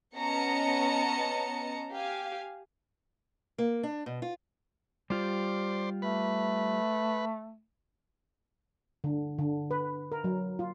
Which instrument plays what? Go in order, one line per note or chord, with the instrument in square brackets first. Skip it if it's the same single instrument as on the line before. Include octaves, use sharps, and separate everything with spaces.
[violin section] B3 C#4 D#5 A5 A#5 C#7
G4 F5 G#5
[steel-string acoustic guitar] A#3
D4
B2
F4
[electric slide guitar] G3 F4 G4 [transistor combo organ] C5 D5
[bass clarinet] A3 [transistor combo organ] B4
[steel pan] D3
D3
B4
A#4
F#3
F4